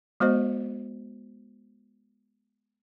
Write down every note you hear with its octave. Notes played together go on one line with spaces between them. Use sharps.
G#3 B3 F#4 C5 D#5